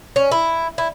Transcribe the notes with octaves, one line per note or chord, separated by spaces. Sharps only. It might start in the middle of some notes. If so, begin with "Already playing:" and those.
C#4
E4
E4